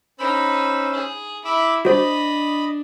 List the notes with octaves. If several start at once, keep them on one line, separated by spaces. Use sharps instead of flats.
C#4 D#4 C5 B5 E6
G#4
E4 B5 D6 E6
D4 F#4 C5 D#5 B5